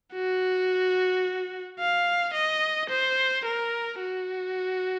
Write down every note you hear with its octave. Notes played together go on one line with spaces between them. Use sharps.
F#4
F5
D#5
C5
A#4
F#4